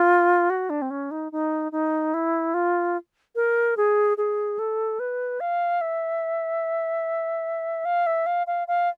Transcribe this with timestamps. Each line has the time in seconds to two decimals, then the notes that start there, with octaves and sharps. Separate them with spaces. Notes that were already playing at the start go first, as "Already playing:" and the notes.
Already playing: F4
0.50 F#4
0.70 D4
0.82 C4
0.91 C#4
1.11 D#4
1.32 D#4
1.72 D#4
2.14 E4
2.54 F4
3.36 A#4
3.77 G#4
4.18 G#4
4.59 A4
5.00 B4
5.40 F5
5.81 E5
7.85 F5
8.06 E5
8.26 F5
8.47 F5
8.68 F5